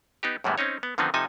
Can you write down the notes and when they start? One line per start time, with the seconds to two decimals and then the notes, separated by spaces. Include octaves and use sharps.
0.23 B3 D#4 G4
0.44 F#2 A2 E3 G3 G#3 B3
0.58 C4 C#4 D#4 C#5
0.83 B3
0.98 D3 D#3 F3 B3 C4 D#4
1.14 C3 F3 D#4 A4 G#5